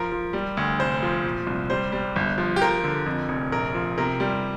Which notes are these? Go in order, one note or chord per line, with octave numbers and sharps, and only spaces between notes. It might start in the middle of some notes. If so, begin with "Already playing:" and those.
Already playing: F3 A#4
F3
G3
D2
F1 C5
F3
A#2
C2
G3 C5
G3
G1
F3
G4
F3 A#4
D3
F2
F1
A#1 A#4
F3
C3 A#4
G3